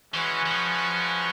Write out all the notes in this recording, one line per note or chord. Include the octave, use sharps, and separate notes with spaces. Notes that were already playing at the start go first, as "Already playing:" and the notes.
E3 G#3 C#4 F#4 B4
E3
F3